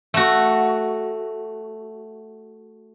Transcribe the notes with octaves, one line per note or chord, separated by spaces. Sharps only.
A3 F#4